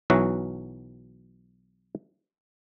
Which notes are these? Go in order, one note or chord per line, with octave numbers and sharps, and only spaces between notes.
B1 E3 F#3 F#4